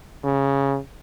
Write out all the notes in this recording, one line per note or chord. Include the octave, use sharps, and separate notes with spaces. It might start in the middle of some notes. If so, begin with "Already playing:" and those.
C#3